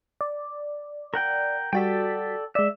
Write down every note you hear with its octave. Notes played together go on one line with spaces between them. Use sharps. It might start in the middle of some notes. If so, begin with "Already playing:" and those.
D5
A#4 F#5 G5
G3 F#4 A4 D5 G5 B6
G#3 D5 E5